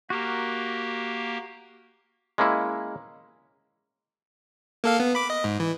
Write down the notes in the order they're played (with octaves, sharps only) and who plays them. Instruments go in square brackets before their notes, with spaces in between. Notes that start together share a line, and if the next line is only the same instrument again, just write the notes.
[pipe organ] A#3 G4 [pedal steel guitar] F#4 A#4
[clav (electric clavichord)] G#3 A#3 C#4 E4
[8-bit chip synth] A#3 A4 F5
B3
B5 D6
D#5
G#2
E3